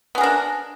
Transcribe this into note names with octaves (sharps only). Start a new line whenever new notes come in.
B3 D4 G#4 A#4